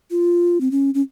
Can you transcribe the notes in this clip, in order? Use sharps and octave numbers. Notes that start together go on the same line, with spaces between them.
F4
C4
C#4
C#4